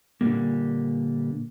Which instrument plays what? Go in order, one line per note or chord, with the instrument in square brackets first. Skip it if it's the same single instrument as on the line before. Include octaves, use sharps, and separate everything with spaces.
[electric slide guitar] A#2 D3 F3 G3 A#3